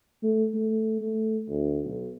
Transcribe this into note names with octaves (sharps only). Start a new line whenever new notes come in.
A3
A3
A3
D2
B1